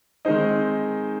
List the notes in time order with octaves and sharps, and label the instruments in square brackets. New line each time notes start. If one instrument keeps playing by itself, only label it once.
[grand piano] D#3 G#3 C4 D#4 C5 D#5